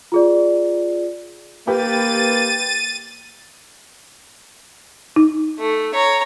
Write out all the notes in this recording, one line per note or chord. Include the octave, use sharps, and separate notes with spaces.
F4 G#4 D5
A#3 G4 B4 A6 D#7
D#4
A3
C#5 A#5